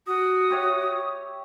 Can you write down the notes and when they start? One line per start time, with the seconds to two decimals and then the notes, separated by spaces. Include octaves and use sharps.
0.07 F#4 D#6
0.50 G4 C#5 E5